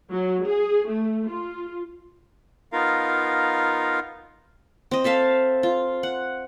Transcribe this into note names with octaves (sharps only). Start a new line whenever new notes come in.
F#3
G#4
A3
F4
B3 D#4 F4 A#4 F5
C4 D#5
A4 E5 F5 A5
F4
F#5